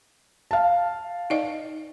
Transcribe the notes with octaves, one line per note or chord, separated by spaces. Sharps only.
F5 A5
D#4 D5 D#5